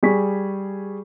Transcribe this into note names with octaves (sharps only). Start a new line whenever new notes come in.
G3 G#4 C#6 B6